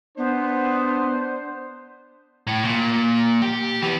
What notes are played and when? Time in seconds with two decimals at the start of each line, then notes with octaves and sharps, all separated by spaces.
0.18 B3 D4 C5
2.47 A2
2.65 A#2
3.42 G4
3.82 E3 B3